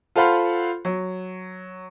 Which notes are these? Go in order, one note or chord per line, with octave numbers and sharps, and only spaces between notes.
F4 A4 C5 F5 F#5 B5
F#3